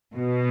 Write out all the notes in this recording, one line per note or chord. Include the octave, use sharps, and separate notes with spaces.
B2